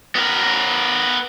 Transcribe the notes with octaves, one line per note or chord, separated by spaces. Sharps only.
B3 A#4